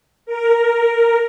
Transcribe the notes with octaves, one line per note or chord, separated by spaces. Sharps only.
A#4